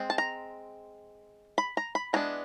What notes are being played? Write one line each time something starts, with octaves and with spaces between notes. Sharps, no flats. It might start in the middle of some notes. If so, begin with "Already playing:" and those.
Already playing: G#3 C4
A5
A#5
B5
A#5
B5
E3 G#3 B3 D4 A#5